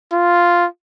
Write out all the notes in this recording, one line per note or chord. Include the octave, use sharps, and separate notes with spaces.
F4